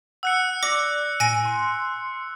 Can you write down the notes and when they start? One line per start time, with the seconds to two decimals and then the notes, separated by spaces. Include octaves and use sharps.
0.23 F#5 E6 F#6 C#7
0.63 D5 D6 A#6
1.20 A2 G#5 A#6 D7
1.45 C6